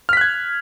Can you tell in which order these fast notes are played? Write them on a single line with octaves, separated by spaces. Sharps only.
F6 B6 F#6 G#6